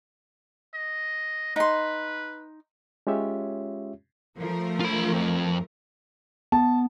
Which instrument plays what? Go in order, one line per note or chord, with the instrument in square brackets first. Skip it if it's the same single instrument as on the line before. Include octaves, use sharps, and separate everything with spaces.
[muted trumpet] D#5
[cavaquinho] D#4 C6 [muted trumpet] B4
[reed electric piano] G#3 C#4 F4 G4 C#5 E5
[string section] F3 A3 A#4
[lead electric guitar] F4 B5
F2
[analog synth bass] B3 [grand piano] A5